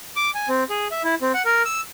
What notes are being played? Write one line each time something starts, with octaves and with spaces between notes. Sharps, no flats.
D6
G#5
C4
G#4
E5
E4
C4
F#5
A#4
E6